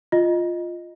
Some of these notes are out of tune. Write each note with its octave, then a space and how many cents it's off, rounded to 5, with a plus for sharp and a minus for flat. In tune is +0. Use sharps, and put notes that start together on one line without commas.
F4 +0 D#5 +0